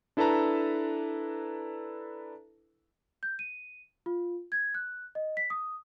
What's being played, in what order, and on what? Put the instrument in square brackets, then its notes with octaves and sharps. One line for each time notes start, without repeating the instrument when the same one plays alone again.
[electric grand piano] D4 E4 A4 B4 A5 A#5
[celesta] G6
D#7
F4
G#6
F#6
D#5
B6
D#6